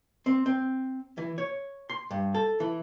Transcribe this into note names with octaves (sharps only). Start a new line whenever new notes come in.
C4
C4
E3
C#5
C6
G2
A4
E3